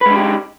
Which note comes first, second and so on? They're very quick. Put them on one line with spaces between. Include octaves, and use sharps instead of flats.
B4 G#3 D4 G4 D#4